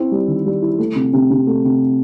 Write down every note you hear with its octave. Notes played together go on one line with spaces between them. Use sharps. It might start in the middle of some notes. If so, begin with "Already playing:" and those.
Already playing: C4 E4
G3
D#3
G3
E4
A3
C3
C3
C3
A3
C3